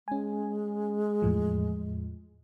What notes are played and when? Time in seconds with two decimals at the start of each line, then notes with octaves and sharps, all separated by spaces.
0.08 G#3 C#4 G#5
1.22 E2 A2 F3